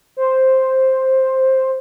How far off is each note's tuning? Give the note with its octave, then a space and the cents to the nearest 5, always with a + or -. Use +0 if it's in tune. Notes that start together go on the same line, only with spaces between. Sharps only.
C5 +5